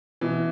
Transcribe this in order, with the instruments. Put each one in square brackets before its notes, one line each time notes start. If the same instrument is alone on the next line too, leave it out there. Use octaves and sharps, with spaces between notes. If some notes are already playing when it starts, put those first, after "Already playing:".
[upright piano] B2 E3